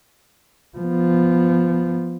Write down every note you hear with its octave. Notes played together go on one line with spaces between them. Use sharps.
F3 B3